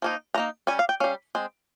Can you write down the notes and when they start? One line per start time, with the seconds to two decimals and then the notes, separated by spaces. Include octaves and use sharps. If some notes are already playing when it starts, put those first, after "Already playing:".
0.02 F3 A#3 D#4
0.34 F3 A#3 D#4 A#5
0.67 G3 C#4 G#5
0.79 F5
0.89 G5
1.00 G3 C#4 F5
1.35 G#3 C4